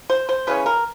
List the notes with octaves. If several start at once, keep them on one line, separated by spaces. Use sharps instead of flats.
C5
C5
C#3 E3 G#3 C#4 B4
A#4